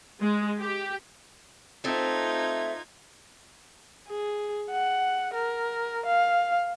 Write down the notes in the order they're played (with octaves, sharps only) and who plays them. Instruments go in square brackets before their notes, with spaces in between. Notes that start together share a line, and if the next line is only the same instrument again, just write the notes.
[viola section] G#3
G4
[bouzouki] A3 C4 [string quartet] D#4 F4 G#6
[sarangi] G#4
F#5
A#4
F5